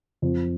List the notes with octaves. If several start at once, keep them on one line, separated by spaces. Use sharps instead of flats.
F2